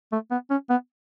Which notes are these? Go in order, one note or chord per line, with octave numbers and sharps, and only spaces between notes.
A3
B3
C#4
B3